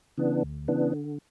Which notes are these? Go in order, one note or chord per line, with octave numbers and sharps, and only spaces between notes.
C#3 E3 B3 D4
D2
C#3 E3 B3 D4
D3